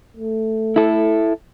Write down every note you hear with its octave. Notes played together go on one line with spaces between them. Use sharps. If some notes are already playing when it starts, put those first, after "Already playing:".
A3
E4 A4